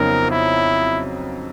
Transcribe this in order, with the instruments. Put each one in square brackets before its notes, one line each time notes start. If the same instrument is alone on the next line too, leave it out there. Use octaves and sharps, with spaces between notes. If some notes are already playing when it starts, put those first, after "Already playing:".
Already playing: [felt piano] F2 C#3 F#3 B3 D#4 [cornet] A#4
[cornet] E4